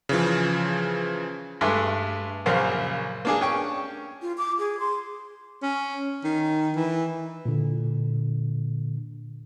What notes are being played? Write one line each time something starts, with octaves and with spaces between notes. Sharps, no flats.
C#3 E3 F3
G2 G#3 A3
A#1 F#2 C#3 A#4 C5
A#3 D4 G#4
C#4 G5 C#6
F4
D6
G#4
C6
C#4
D#3
E3
A#2 D3